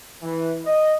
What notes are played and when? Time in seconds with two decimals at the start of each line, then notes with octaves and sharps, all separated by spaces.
0.23 E3
0.66 D#5